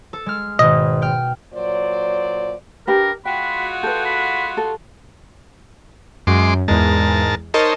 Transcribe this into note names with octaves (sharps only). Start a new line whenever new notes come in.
A4
G#3 F6
G#1 B2 D#5
G5 F6
A#2 F#3 C5 D5
D4 G4 A#4 B4
G#3 F4 F#4 G5 B5
A4 B4 G5
B5
A4
F#2 G#3 C6 D6
E2 G#2 G#3 A#4 A5
D#4 A#4 C5 C#5 D#5 A5